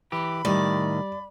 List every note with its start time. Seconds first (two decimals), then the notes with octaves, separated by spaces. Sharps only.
0.12 E3 G4 B5
0.45 A2 D#3 G3 D5